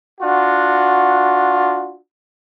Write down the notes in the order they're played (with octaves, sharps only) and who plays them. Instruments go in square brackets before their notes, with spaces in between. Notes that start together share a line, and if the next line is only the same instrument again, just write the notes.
[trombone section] D4 F4 F#4